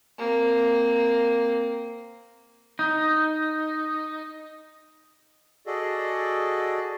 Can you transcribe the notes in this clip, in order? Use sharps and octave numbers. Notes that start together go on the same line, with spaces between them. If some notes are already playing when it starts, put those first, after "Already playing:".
A#3 C4
D#4
F#4 G#4 A4 D5 D#5